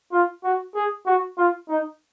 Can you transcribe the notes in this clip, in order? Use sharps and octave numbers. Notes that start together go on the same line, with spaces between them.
F4
F#4
G#4
F#4
F4
D#4